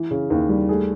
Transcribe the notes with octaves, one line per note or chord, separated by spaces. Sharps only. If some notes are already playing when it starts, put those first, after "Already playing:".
Already playing: E3
C#3
D#2
G3
A3 G#4